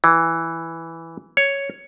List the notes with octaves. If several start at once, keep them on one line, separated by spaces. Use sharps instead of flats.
E3
C#5